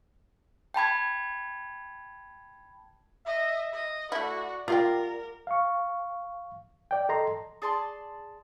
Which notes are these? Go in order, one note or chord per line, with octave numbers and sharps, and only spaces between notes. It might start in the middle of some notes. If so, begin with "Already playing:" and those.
G5 A5 B5 G#6
D#5 E5
D#5
A3 E4 F#4 D5
F4 G4 A#4 F5 G5
F5 C#6
D5 G5
A4 D#5 A#5 C6
G#4 D5 A5 C6